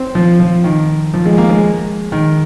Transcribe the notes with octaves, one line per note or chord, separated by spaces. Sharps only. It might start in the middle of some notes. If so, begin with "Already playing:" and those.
Already playing: C4
F3
F3
D#3
F3
G#3
A#3
G#3
D#3